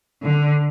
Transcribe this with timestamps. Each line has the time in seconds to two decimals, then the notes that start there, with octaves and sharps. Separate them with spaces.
0.23 D3